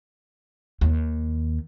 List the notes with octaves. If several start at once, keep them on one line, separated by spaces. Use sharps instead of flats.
D#2